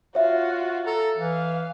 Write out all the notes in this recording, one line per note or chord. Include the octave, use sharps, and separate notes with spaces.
F4 F#4 C#5 E5
A4 A#5
E3 F5